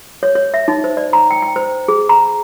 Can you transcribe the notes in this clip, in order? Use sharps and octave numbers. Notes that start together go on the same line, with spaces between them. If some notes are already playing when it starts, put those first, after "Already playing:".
C#5
C#5
E5
D#4
C5
D5
A#5
G5
G5
C5
G#4
A#5